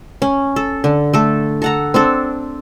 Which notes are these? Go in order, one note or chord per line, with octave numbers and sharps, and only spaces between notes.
C#4
A4
D3
A3 A4
A4 F#5 A#5
C4 D4 A4